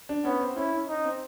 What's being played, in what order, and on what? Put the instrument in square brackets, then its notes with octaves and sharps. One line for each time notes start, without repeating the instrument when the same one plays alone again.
[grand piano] D4
[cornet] B3 [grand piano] C#4
[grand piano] C4
[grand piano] C#4 [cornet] E4
[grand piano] C#4
[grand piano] C#4 [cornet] D#4
[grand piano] C4